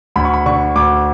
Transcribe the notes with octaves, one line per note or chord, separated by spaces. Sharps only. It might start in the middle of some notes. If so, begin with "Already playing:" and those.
D2 B5
C#6
B5
D3 C#6
D2 D6